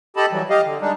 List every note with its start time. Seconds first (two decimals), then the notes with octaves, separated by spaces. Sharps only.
0.16 G4 A4 D#5 A5 B5
0.31 E3 F#3 G3
0.50 G4 D#5 F5
0.64 D3
0.81 G3 G#3 D4 D#4